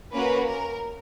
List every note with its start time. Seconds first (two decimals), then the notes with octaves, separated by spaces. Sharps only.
0.13 A#3 C#4 F#4 B4
0.48 A#4